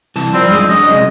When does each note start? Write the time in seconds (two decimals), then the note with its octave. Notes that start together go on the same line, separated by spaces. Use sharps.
0.16 C2 E3 A5
0.34 F3 G3 C4 A#4
0.48 G2 G#3 D#5
0.69 F#3 C#4 D4 D#5
0.91 C2 G#3